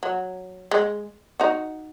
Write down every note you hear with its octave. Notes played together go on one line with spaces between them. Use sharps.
F#3
G#3
D#4 F#4